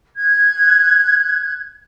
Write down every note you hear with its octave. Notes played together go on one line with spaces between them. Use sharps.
F#6 G#6